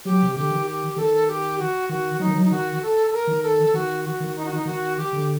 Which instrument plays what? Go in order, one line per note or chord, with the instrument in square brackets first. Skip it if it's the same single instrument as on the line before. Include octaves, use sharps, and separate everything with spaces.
[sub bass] F#3 [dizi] G4
[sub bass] C3
[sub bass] D3 [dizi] G4
[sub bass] D#3
[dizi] G4
[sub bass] D#3 [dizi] A4
[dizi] G4
F#4
[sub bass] D#3 [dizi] F#4
[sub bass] F#3 [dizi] D#4
[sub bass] D#3
F#3
[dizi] D#4
[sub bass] D#3 [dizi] F#4
[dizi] A4
A4
A#4
[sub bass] D#3
[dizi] A4
[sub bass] D#3 [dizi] F#4
[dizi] F#4
[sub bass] D#3
[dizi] D#4
F#4
D#4
[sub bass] D#3 [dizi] F#4
[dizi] G4
[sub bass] D3